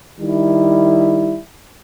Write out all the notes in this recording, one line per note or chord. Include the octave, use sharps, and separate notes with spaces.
D#3 G3 E4